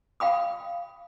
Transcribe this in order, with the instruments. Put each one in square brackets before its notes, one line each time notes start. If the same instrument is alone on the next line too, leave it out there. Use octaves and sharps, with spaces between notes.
[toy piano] F5 G5 B5 D#6